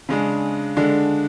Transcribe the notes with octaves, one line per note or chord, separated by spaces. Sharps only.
C#3 G#3 D4
D3 G#3 D4